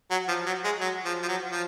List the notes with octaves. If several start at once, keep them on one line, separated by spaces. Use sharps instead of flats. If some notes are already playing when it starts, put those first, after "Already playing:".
F#3
F3
F#3
G#3
F#3
F3
F3
F#3
F3